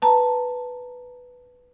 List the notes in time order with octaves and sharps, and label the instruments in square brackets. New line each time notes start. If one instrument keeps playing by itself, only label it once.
[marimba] B4 A5 A#5